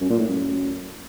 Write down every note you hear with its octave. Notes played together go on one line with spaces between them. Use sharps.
F#2
A#2
A2
F#2